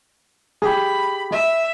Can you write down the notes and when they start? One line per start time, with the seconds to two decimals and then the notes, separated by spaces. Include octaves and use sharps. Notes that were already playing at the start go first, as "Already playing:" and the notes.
0.62 G4 G#4 B5
1.32 E5